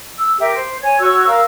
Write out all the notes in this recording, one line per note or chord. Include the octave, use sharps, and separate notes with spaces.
E6
G4 A#4 E5
C5
C#5 G#5
F#4 C#5 C#6 E6
A#4 F5 E6